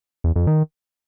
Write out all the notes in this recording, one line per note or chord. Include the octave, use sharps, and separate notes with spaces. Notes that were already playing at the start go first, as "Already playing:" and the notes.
E2
F2
D#3